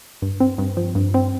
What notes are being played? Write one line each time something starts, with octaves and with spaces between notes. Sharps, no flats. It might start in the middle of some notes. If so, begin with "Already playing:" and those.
G2
C4
G2
F3
G2
C4